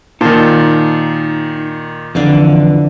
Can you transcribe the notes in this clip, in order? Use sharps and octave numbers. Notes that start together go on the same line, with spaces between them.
A#2 D#3 D#4 C5 A5 C6
F2 D3 E3 F5 D6